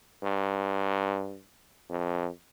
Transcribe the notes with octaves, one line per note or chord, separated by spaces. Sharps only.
G2
F2